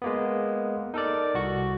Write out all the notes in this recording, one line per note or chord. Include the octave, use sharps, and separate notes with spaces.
G#3 A#3 B3
D#4 A4 A#4 D5
C2 F#4 C#6